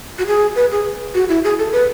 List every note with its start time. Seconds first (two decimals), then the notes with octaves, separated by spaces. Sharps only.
0.19 F#4
0.27 G#4
0.56 B4
0.71 G#4
1.15 F#4
1.29 E4
1.44 G#4
1.58 A4
1.72 B4